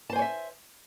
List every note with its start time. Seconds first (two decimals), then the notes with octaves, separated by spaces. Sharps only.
0.10 A5
0.13 C5
0.16 G#5
0.19 C#5
0.22 E5